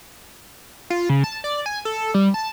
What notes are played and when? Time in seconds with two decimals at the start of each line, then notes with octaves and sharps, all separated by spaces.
0.90 F4
1.09 C#3
1.24 A5
1.44 D5
1.66 G#5
1.85 A4
2.14 G3
2.34 A5